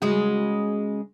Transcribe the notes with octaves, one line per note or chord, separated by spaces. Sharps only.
C#3 G#3 F#4